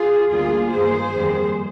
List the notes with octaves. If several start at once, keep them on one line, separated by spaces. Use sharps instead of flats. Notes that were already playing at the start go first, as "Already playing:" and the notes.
Already playing: F4 G#4
D2 D3 G3 A#3 F4 G#4
G2 D#3 A#3 G#4 C5
F2 D#3 G3 A#3